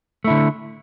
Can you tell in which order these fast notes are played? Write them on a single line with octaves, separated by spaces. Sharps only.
A3 E4 D3